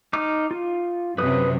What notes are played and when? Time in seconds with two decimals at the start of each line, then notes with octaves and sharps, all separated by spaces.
0.13 D#4 D6 F6
0.51 F4
1.18 F#2 C3 B4 D#6